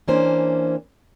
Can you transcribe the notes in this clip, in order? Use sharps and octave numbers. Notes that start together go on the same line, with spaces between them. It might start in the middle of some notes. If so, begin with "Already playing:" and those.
E3 A#3 C#4 D4 C5